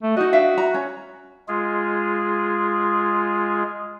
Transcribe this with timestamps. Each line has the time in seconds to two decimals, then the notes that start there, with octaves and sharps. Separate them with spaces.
0.03 A3
0.17 D#4 F#4 D#5
0.33 D4 E5 F5
0.58 A#5
0.74 C#4
1.48 G#3 F4 G#4